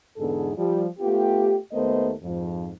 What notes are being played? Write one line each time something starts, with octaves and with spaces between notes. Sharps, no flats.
E2 G#2 D3 B3 G#4 A4
F3 G3
A3 B3 F4 G4
D#2 A3 B3 A#4 C5 D#5
F2 G#2 F3